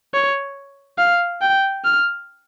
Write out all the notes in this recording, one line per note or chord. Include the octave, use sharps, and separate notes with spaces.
C#5
F5
G5
F6